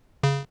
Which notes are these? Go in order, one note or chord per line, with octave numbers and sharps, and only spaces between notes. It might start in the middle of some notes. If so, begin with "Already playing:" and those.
C#3